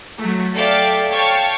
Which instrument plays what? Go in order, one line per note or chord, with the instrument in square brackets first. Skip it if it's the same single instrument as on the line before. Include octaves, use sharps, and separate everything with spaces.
[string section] F#3 A3
A4 D5 E5 F5 G5 D6
C#5 F5 G5 A5 C#6